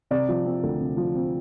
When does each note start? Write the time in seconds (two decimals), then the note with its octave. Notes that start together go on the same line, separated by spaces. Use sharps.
0.11 C3 D5
0.28 F3
0.46 C4
0.63 D2
0.80 C3
0.97 F3
1.15 C4